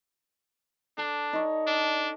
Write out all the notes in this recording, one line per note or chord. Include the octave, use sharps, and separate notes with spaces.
D4 A4
D#4 C#5 D5
D4